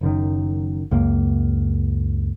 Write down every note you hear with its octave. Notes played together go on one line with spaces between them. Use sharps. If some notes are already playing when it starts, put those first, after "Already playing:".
F#1 F#2 D#3
C#2 F#2 A#3